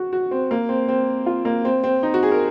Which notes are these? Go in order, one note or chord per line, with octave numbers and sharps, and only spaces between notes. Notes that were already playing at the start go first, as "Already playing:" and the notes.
Already playing: F#4
F#4
C4
A#3
C4
C4
F4
A#3
C4
C4
D#4
F#4
G#4
A#4